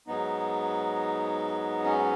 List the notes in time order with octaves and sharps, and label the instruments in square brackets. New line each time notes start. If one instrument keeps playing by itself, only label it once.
[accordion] G#2 F#3 B3 D#4
C#4